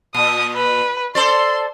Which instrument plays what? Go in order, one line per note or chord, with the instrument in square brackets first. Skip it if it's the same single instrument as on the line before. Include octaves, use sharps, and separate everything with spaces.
[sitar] A#2 [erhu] D#6
[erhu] B4
[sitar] A4 C5 D5 [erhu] C6